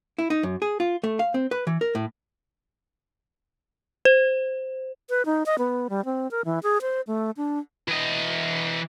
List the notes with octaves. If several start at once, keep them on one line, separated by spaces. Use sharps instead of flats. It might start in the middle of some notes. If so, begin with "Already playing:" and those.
E4
D#4
F#2
G#4
F4
A3
F5
C4
B4
E3
A#4
A2
C5
B4
D#4
D#5
B3
G3
C4
A#4
E3
G#4
C5
A3
D4
E3 D#5